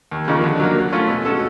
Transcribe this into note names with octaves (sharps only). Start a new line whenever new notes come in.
D#2
C#3 F3 A#3 D#4
D3
F#3 A#3
F#3
A3 C#4 F4
B2
G#3 C#4 F#4 A4